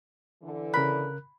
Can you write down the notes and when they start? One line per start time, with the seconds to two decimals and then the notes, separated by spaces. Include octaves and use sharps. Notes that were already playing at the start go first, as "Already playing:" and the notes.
0.42 D3 E3
0.74 C#3 A#4 B5 F#6